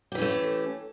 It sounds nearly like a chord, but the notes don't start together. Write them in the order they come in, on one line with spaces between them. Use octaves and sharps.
G4 E3 C#4 A3